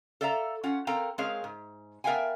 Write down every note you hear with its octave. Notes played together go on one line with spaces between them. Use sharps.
A4 D5 E5 F5 A#5
C#4 F4 F#5
C4 A4 A#4 F5 G5 A#5
G#3 C4 G#4 A#4 C#5 F5
G#2
B3 A#4 E5 F5 G5 G#5